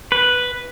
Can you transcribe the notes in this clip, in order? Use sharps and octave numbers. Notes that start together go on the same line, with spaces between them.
B4